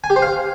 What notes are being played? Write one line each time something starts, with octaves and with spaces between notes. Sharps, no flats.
G#5
G4
C5
F5